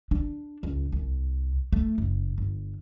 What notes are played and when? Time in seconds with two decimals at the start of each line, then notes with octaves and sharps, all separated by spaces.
0.11 D4
0.63 C#2
0.92 C2
1.72 A3
1.98 F#1
2.38 G1